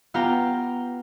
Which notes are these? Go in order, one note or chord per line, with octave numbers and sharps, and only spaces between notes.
B3 F4 G4 G5 A#5